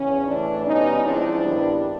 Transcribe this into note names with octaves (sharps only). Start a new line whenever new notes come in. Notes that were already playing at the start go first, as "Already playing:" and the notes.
Already playing: E2 C#3 C#4
A2 E3 A3 D4
B2 G3 B3 C#4 D#4
C#3 F3 G#3 C4 D4 E4
G2 D#3 G3 B3